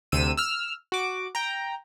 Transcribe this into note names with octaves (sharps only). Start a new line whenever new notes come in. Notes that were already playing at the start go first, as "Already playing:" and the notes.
D2 C3 E6 D#7
E6 F6
F#4 D6
G5 A#5